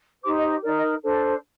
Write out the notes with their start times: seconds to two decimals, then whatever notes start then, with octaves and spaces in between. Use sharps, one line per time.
0.22 D#4 G4 C5 D6
0.37 D#5
0.49 D#5
0.62 D#4 A#4 D5
0.76 D#5
1.02 D4 A4 C5